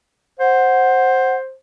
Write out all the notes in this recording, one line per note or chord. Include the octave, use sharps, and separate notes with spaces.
C5 F#5